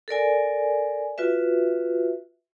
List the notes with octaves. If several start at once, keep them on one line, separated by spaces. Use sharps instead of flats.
A4 A#4 D5 G#5
F4 F#4 B4 E5